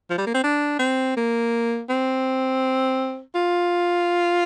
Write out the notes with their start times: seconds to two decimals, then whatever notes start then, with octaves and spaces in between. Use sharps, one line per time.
0.10 F3
0.18 G3
0.27 A#3
0.34 C4
0.43 D4
0.79 C4
1.17 A#3
1.89 C4
3.35 F4